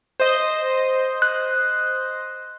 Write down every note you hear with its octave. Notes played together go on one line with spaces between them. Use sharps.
C5 D#5
F#6